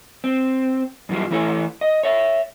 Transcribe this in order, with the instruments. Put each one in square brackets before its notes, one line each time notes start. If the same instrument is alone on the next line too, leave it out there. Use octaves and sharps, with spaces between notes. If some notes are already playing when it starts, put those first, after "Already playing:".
[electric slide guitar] C4
F#2 E3 G3 F4
E3 A3 E4 A4 B4 C#5
D#5
C#5 E5